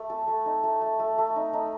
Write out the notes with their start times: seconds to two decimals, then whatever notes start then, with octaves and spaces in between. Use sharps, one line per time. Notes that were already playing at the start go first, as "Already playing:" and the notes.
Already playing: A3
0.10 A4
0.28 A3
0.46 D#4
0.64 A3
0.81 A3
1.00 A3
1.18 A3
1.36 D#4
1.53 D#4